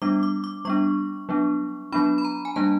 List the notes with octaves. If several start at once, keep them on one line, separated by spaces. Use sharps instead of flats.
G3 B3 D4 D6
D6
D6
G3 B3 D4 C#6
F#3 B3 D4
F#3 B3 D4 B5
B5
A#5
G#5
G3 A#3 D4 A5